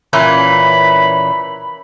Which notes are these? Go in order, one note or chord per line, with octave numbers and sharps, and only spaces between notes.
A#2 E3 C#4 B5